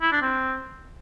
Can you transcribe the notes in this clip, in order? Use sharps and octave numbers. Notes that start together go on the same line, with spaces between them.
E4
D4
C4